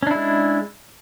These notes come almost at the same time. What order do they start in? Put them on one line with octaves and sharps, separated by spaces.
C#4 D4 E4 G#3